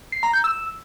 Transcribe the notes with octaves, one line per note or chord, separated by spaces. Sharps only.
C7
A#5
G6
E6